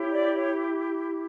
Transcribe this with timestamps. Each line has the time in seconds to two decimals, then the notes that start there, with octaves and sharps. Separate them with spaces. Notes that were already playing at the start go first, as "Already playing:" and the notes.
Already playing: E4 G4 C#5
0.11 D5
0.31 C#5